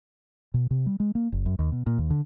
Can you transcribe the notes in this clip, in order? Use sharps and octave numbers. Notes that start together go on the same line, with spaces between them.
B2
C3
G3
G#3
A#3
F#1
F#2
D#2
B2
A#2
D#2
D3